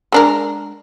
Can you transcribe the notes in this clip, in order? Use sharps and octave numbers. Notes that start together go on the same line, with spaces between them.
G#3 D4 A#4